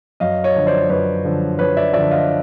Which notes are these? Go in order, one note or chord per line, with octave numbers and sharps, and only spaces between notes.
F#2 D#5 F5
C#5 D#5
D3 F3
C5 D5
F#2 B4 C#5
D3 F3
F#2 B4 C#5
D5 E5
D3 F3 D5 E5
D#5 F5